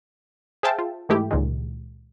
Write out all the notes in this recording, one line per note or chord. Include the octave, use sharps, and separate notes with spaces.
G#4 C5 E5 F5 G5 A5
F4
G#2 E3 G#3 A3 E4 G4
C#2 A#2 D#3 G#3